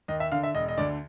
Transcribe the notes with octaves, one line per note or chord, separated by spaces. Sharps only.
D#2 D#5
E5
D3 F5
E5
E1 D#5
D#5
D2 D3 D5